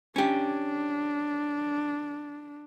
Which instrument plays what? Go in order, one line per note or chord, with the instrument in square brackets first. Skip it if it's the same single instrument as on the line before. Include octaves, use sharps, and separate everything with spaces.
[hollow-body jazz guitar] C#4 G4 [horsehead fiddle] D4